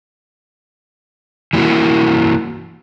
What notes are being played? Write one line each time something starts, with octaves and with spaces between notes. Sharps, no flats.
E3 F#3 A#3 E4 F#4